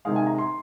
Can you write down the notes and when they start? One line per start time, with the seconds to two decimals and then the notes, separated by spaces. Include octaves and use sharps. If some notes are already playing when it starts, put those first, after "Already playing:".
0.05 C3 D#3 G#3 F5
0.16 G#5
0.27 A#5
0.39 C6